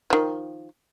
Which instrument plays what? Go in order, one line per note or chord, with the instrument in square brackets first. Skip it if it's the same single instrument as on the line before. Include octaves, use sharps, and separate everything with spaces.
[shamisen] D#3 F3